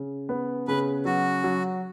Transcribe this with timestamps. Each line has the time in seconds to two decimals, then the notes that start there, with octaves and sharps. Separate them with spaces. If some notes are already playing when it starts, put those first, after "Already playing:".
Already playing: C#3
0.29 B3
0.68 C#3 B4
1.05 F#3 F#4
1.44 F#3